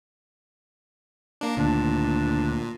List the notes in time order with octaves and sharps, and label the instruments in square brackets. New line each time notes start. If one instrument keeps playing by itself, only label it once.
[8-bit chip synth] A#3 D4
[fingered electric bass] D2 D#3 [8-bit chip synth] A#2 [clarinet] D4